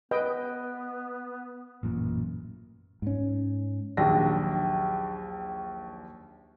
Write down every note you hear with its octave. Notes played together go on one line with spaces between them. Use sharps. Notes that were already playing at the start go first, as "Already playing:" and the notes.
B3 B4 D#5 G5
A1 F#2 A#2
G#2 C#4
A#1 D#2 F#3 D4 A#6